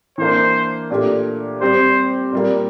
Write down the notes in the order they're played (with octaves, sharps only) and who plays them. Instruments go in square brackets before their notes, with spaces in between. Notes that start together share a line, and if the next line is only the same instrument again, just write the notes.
[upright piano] E3 A#3 D4 [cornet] C5
[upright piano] A#2 A3 D4 G4
[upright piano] G3 C4 G4 [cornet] C5
[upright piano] A#2 G3 A#3